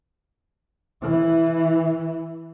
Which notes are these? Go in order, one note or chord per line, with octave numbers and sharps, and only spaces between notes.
E3 E4